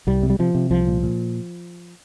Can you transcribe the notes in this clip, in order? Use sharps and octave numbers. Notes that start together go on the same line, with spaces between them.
C2 G3
C3
G3
C3 F3
C3
C2 F3
A#2
A#2